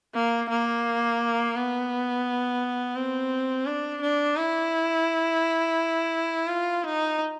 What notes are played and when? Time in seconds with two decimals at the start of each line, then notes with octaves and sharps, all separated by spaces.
0.14 A#3
0.49 A#3
1.55 B3
2.96 C4
3.66 D4
4.02 D4
4.36 E4
6.48 F4
6.83 D#4